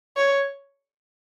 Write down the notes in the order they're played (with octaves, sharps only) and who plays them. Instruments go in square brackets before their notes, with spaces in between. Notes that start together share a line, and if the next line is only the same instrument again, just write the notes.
[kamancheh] C#5